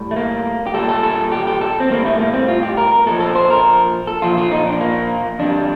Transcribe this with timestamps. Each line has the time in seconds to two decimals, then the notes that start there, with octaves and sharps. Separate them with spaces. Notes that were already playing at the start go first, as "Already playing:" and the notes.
Already playing: A2 G3
0.11 A3
0.16 A#3
0.66 G4
0.74 A#2 G3 A4
0.89 A4
1.03 A4
1.32 G4
1.47 G4
1.61 A4
1.80 C4
1.90 A2 G3 A#3
2.05 A3
2.19 A#3
2.34 C4
2.48 F4
2.63 G4
2.77 A#4
2.92 A#4
3.06 A#2 F3 A4
3.20 A4
3.35 C5
3.50 A#4
4.07 A4
4.22 A#2 F3 F4
4.38 F4
4.51 D#4
4.66 D4
4.81 A#3
5.39 F2 D3 G3 D4